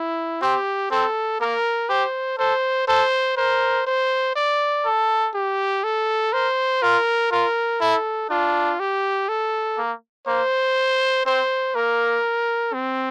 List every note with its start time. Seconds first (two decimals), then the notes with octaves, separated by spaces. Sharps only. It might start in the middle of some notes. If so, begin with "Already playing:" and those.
Already playing: E4
0.42 C4 G4
0.91 C4 A4
1.40 A#3 A#4
1.89 G4 C5
2.39 A4 C5
2.88 A4 C5
3.37 A#4 C5
3.87 C5
4.36 D5
4.85 A4
5.34 G4
5.84 A4
6.33 A#4 C5
6.82 F4 A#4
7.31 F4 A#4
7.81 E4 A4
8.30 D4 F4
8.80 G4
9.29 A4
9.78 A#3
10.27 A#3 C5
11.26 C4 C5
11.75 A#3 A#4
12.74 C4